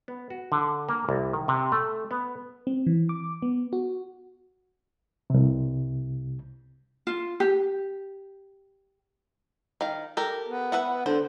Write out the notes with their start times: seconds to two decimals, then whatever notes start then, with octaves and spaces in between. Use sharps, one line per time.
0.08 B3
0.30 F#4
0.52 D3
0.89 A#3
1.09 C2
1.33 D#3
1.48 C3
1.72 A3
2.11 B3
2.67 C4
2.87 E3
3.09 D6
3.42 B3
3.73 F#4
5.30 C2 C3
7.07 F4
7.40 G4
9.81 D#3 F5
10.17 G4 A4 A#4
10.48 B3
10.72 B4 E5 F#5
11.06 D3 C5